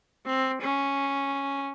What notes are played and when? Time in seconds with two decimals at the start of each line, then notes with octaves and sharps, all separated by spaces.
0.26 C4
0.61 C#4